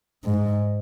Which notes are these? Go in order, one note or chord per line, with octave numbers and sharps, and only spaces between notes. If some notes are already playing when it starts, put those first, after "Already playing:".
G#2